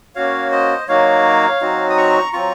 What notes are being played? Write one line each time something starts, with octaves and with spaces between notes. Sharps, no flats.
A#3 C#4 F#4 C#5 F5
C5 D#5
F#3 A#3 D#4 F#4 C#5 F5
F#3 C4 D#4 F#4
D#6
A#5 C#6
F#3 C4 F4 A#5 C#6